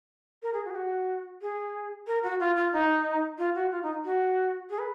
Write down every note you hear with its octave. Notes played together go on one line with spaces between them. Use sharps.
A#4
G#4
F#4
G#4
F#4
G#4
A#4
F#4
F4
F4
D#4
F4
F#4
F4
D#4
F#4
G#4
B4